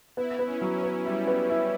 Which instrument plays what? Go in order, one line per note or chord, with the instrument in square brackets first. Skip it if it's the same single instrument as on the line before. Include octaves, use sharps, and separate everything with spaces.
[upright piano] B3 [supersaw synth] E4
[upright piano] B3
[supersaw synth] C#4
[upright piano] F#3
[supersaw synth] C#4
[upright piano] B3
[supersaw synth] G3 [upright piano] E4
[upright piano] B3
E4